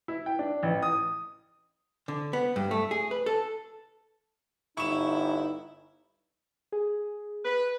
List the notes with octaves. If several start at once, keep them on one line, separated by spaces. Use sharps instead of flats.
E4
G5
D4
A1
D#6
D3
B3
G2
A3
G#4
B4
A4
G1 D#4 E4 C#6 E7
G#4
B4